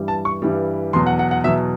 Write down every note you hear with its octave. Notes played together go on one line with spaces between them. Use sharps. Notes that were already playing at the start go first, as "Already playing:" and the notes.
Already playing: G2 E3 G3
A5
C#6
G2 E3 G3
E2 B2 F#3 C6
F#5
F#5
F#5
E2 B2 F#3 E5